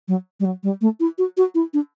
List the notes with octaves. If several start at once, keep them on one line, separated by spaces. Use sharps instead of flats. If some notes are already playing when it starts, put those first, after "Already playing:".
F#3
G3
F#3
G3
A3
E4
F#4
F#4
E4
D4